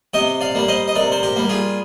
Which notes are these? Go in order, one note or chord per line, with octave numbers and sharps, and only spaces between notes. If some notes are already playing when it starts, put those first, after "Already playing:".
C3 D#5 G5
D5 F5
G3 A#3 D5
C5 D#5
D#5
C3 A#4 D5
C5
G4 A#4
G3 A#3
F4 G#4